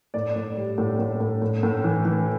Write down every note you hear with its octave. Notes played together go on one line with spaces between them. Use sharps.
A2 D5
A2
G3
A2
A2
A2
A2
A2
E3
E3